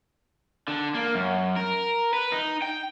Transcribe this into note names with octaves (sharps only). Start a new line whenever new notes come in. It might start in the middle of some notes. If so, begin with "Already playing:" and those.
D3
A#3
F#2
A#4
B4
D#4
G5